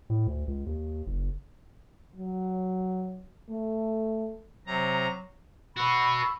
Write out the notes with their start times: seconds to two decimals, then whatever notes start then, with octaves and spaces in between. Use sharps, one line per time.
0.10 A2
0.27 D2
0.48 C#2
0.66 D#2
1.07 F#1
2.16 F#3
3.49 A3
4.66 C3 F#3 A#5
5.76 F#4 B4 B5 C#6 E6